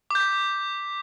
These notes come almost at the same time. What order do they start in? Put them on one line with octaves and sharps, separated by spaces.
D6 G6 B6